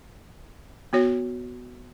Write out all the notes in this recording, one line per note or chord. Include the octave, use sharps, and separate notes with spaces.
B3 F#4 C#5